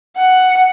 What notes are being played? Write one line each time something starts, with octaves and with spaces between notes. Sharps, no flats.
F#5